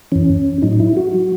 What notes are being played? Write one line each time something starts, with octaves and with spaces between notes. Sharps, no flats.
F#2 E3 C#4
A2 F#3 D#4
D#4
E4
F#4
F#3